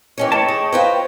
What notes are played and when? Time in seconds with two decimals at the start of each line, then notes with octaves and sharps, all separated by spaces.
0.18 E3 C#4 C#5 D#5 G5
0.32 E3 A3 C#5 A5
0.48 G#4
0.72 F4 B4 C5